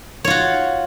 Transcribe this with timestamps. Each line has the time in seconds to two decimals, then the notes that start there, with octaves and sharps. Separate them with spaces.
0.24 C#5
0.27 F4
0.30 F#4